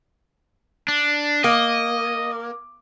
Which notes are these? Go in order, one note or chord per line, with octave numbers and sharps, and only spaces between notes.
D4
A#3 D#5